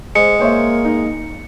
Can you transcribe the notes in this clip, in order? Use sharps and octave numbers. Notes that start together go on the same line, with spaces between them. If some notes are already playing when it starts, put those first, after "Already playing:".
G#3 C5 C#7
A#3 C5 C#5 E5
D#4